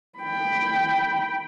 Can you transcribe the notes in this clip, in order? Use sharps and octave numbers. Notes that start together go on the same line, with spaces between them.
G5 B5